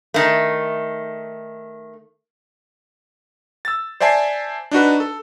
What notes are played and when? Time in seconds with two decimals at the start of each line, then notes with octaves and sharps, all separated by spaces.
0.14 D#3 A3
3.65 E6 A6
4.00 C5 D5 E5 G#5 A5 C7
4.71 D4 D#4 F#4 B4
5.00 A4